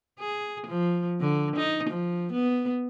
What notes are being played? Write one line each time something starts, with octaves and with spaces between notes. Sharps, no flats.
G#4
F3
D3
D#4
F3
B3